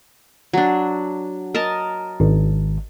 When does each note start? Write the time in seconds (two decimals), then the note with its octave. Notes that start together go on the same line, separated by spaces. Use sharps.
0.53 F#3 D4
1.55 A#4 D#5 A5
2.20 G#1